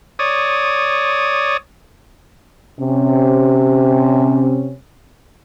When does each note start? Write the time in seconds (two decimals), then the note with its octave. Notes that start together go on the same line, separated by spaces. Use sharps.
0.19 C#5 D5 D#6
2.80 C3 C#4